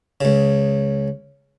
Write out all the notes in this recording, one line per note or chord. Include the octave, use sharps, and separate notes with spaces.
C#2 C#3